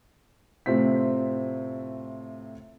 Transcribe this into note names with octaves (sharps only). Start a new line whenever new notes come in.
A2 C3 C4 F4 B6